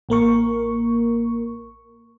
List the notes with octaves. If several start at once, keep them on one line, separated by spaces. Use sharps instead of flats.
A1 A#3 A#4 C#6